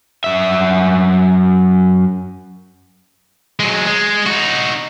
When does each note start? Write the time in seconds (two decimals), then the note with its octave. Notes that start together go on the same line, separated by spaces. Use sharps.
0.24 F#2 E5
3.60 F#3 G#3
3.87 G#3
4.26 D#4 F#4